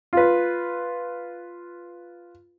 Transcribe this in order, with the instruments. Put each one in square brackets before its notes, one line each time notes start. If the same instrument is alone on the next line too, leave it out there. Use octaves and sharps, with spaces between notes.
[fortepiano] F4 B4